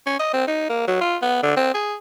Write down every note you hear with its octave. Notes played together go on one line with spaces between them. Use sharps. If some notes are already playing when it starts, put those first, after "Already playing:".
C#4
D#5
C4
D#4
A#3
F#3
F4
B3
D3
C4
G#4